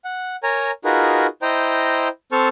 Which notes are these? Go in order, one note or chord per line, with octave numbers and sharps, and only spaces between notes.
F#5
A#4 C#5 G#5 A#5
D#4 F4 F#4 G#4 A#4 B4
E4 C5 D#5 G5 A#5
C4 A4 C5 A5 C#6 F6